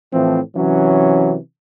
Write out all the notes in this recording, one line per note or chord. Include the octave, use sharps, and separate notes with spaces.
A2 E3 F3 C4
C3 E3 F#3 C#4